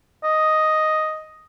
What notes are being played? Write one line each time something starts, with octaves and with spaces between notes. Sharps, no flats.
D#5